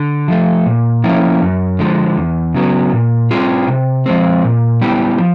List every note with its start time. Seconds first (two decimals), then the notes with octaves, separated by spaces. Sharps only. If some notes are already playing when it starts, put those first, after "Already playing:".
Already playing: D3
0.28 F3 A3
0.66 A#2
1.04 F3 A#3 C#4 E4
1.42 F#2
1.79 D3 F3 G#3
2.17 E2
2.54 C#3 F#3 B3
2.93 A#2
3.31 G3 C4 F4 G#4
3.68 C3
4.06 F3 G#3 C4
4.44 A#2
4.82 G3 B3 E4 G4
5.18 F3